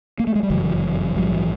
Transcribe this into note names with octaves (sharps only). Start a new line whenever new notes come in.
A#3
A3
G#3
G3
G1 F#2 C#3 E3 F#3
A#1 G#2 F3 G3
E3 F#3